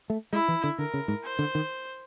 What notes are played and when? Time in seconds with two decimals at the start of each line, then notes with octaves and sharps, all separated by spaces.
0.10 A3
0.32 G#3 E4
0.48 E3
0.64 D3
0.78 D3 A#4
0.94 C#3
1.08 G#2
1.24 C5
1.39 D3
1.55 D#3